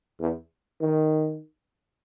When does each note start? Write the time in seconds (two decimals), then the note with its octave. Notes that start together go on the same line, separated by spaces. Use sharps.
0.20 E2
0.81 D#3